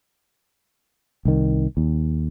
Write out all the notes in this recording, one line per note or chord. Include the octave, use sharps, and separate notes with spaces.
C2 D#3
D#2